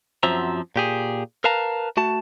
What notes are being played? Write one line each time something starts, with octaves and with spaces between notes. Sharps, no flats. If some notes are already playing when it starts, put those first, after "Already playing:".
F#2 F3 F#3 C4 E5 A#5
A#2 G4 G#4
A#4 B4 F5 A5 A#5
A3 F#4 A5